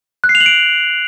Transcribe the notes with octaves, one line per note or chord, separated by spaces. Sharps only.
F#6
C7
F7
F#7
D7